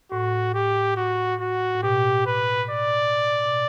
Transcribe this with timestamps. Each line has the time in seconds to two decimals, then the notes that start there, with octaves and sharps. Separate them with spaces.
0.12 A2 F#4
0.54 G4
0.97 F#4
1.41 F#4
1.75 A2
1.83 B2 G4
2.26 B4
2.70 D5
3.46 B2